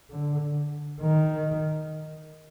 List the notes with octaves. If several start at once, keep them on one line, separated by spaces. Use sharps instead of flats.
D3
D#3